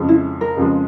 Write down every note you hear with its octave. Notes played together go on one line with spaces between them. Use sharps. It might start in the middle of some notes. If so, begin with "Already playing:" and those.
Already playing: F2 C#3 F3 G#3
E4
A#4
F2 C#3 F3 G#3